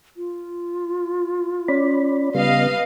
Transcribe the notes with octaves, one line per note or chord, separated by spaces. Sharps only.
F4
C#4 D5 B5
C#3 G3 B3 B4 D#5 F5